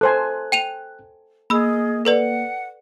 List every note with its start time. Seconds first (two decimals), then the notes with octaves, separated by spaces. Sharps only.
0.01 A4 C5 G#5 F#6
0.52 G5 D#7 F7
1.50 A#3 G#4 A#4 D#5 B5 E6
2.05 A4 B4 D5 F#5